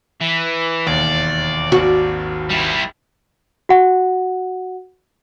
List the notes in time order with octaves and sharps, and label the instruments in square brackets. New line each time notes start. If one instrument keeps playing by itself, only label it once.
[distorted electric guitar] E3
[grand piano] E1 D#2 [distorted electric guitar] D5
[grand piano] G#1 D#2 [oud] F#4
[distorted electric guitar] G3 E4
[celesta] F#4 F#5